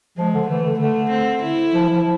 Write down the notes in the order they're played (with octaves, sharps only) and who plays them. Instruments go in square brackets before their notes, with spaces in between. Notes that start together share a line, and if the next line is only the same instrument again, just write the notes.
[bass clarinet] F3 [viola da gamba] G#3
[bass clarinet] D3
[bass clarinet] E3 [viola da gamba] A3
[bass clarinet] D3
[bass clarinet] D3 [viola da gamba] A3
[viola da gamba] C4
E4
[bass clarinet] F3
F3